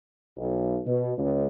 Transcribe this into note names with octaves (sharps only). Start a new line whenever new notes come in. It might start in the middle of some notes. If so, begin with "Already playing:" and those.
B1
B2
C#2